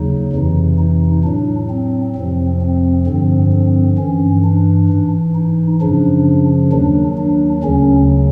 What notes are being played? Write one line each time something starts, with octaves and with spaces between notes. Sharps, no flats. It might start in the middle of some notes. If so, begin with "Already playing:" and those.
Already playing: D#2 C#3 F#3 D#4
F2 C3 E3
D#4
A2 F#3 D4
C4
F2 C3 F3 C4
C4
G2 D3 F3 C4
C4
G2 E3 C#4
D4
G#2 E3
D#4
F#2 C#3 F3 D4
D#2 D#3 F#3 D4
D4
D2 C#3 F#3 C#4